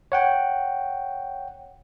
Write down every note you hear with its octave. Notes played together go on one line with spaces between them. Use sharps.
C#5 F#5 G5